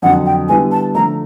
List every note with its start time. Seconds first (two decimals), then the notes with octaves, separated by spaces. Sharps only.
0.02 F2 D3 F#3 F#5
0.26 G5
0.49 D3 G3 B3 E4 G#5
0.72 A5
0.95 D3 F3 A3 A#5